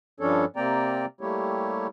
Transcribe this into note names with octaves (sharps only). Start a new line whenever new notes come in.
G2 F3 C#4 D4 A4 C#5
C3 A#3 C4 D5 G5 A#5
G3 A3 A#3 E4 G4 C#5